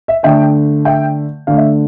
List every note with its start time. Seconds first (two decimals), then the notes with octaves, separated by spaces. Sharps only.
0.08 E5
0.23 D3 A3 E5 G5
0.85 E5 G5
1.47 D3 A3 F5
1.57 E5